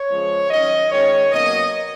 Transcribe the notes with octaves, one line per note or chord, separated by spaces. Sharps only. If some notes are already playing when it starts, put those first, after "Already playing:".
Already playing: C#5
C#3 F3 G#3 C#4
D#3 F#3 C#4 D#5
D#3 G#3 C#4 C#5
B2 F#3 A#3 C#4 D#5